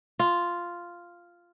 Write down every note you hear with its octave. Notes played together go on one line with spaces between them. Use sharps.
F4